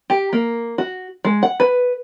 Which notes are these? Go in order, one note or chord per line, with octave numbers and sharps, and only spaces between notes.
G4
A#3
F#4
G#3
F#5
B4